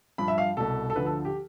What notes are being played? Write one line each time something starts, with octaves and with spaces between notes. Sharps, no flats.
G2 F3 B5
E5
F5
C2 B2 A4
A4
D2 D3 F3 B4
A4
G4